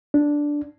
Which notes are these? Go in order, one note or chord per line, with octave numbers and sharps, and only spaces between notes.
D4